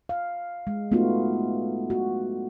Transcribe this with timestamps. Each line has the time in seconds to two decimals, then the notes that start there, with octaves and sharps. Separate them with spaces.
0.09 F5
0.67 G#3
0.92 A3 B3 D#4 F4 F#4
1.90 F#4